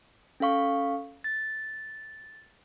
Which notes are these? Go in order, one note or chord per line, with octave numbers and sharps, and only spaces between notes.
C#4 A4 F5 C#6
A6